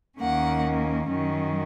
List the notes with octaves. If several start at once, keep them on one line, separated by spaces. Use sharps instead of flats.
D#2 D#3 A#3 C#4 F#5
F#2 D#3 F#3 C#4